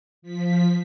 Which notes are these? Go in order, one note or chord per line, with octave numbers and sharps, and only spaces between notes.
F3 B6